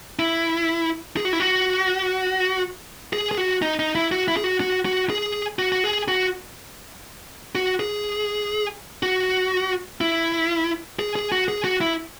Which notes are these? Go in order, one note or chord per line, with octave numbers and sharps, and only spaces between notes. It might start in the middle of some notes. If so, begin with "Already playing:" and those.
E4
G#4
F#4
E4
F#4
G#4
G#4
F#4
D#4
D#4
E4
F#4
E4
G#4
F#4
F#4
F#4
G#4
F#4
F#4
G#4
F#4
F#4
G#4
F#4
E4
G#4
G#4
F#4
G#4
F#4
E4